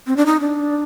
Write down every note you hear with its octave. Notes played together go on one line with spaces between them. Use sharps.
C4
D4
D#4
D4